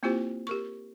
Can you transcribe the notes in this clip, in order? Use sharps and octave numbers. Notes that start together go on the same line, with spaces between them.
A#3 C4 E4 F4 G4 C5
G4 A#4 C#6